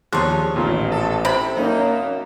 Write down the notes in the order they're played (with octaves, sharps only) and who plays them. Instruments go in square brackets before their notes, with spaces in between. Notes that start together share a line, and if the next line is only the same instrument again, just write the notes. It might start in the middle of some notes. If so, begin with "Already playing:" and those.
[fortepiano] D#2 C6 F#6 [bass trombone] F3 [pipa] D4 C#5 [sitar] G#4
[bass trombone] A1 [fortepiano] A#2 F4 [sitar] D#3
[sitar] A4
[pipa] C3 B5
[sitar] F#2 D#4 [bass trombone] A#3